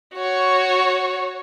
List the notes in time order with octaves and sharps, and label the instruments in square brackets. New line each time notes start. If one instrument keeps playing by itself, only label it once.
[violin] F#4 C#5